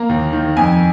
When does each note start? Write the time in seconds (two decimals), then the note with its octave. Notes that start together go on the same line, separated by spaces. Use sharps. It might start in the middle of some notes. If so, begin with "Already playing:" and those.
Already playing: A#3 A#5
0.09 D#2
0.33 D#3
0.57 F2 G#5